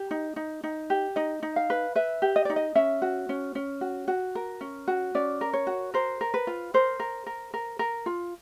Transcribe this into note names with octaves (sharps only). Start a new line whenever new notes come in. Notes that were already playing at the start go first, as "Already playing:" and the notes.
Already playing: G4
D#4
D#4
D#4
G4
D#4 D#5
D#4
F5
B4
B4 E5
G4
D#5
D#4 D5
D#5
C#4 E5
F#4
C#4
C#4
F#4
F#4
A#4
C#4
F#4
C#4 D5
A#4
C#5
F#4
A#4 C5
A#4
B4
F4
A#4 C5
A#4
A#4
A#4
A#4
F4